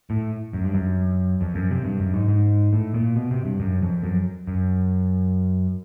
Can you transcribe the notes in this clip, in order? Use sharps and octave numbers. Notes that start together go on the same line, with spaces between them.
A2
F#2
G2
F#2
F2
F#2
C3
G2
F#2
G#2
G#2
A2
A#2
B2
C3
G2
F#2
F2
F#2
F#2